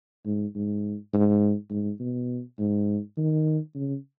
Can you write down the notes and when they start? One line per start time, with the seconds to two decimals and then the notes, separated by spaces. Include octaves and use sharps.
0.26 G#2
0.55 G#2
1.13 G#2
1.70 G#2
2.00 B2
2.59 G#2
3.17 D#3
3.75 C#3